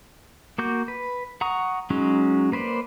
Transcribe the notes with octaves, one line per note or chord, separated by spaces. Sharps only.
A#3 F#4 D6 G6
B4
F#5 A#5 C#6 D#6
F#3 G#3 C#4 D#4
A#3 B4 C5 D5